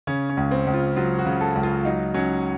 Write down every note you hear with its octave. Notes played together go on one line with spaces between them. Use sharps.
C#3 C#4
C#4
C#2
C4
C#2
F4
F#3 F4
F#4
C#3
A4
C#2
F4
F#3 D#4
F#3 C#4